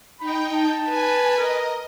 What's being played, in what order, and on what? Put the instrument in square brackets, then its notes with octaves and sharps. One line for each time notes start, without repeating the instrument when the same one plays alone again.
[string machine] D#4 G5 [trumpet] B5
[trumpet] A5
[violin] B4 [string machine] G#5
[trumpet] A#4 [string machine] D#5